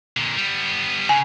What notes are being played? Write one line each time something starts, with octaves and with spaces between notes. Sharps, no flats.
A#2 D3
G3 B3
C#3 G#5